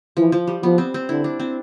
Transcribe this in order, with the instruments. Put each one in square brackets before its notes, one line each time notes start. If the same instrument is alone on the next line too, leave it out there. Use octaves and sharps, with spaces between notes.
[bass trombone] E3 [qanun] F3
[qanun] F3
G3
[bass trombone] F3 [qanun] B3
[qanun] C4
C4
[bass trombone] D3 [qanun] E4
[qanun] D4
C4